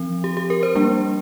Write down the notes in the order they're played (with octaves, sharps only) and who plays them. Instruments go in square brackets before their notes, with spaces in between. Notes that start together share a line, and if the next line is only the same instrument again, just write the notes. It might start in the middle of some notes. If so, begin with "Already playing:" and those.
Already playing: [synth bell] F3 C4
G4
G4
A#4
C5
G3 A#3 D4